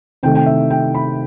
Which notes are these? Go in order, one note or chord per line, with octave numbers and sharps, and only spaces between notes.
C3 D#3 A3 G5
G5
E5
G5
B5